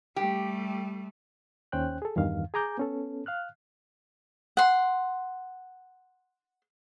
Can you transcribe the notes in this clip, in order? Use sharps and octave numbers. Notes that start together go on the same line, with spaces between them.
G3 A3 G4
D#2 C#4 C5 G5 F#6
G#4 A4
E2 G2 D#3 F5
G#4 G#5 A#5 D6 G6
B3 C#4 A4
F5 F6 F#6
F#5 C6